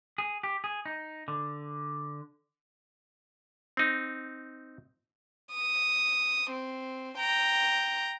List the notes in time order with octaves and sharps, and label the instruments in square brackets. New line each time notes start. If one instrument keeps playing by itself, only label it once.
[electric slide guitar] G#4
G4
G#4
D#4
D3
[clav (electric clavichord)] C4 D#4
[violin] D#6
C4
G5 A#5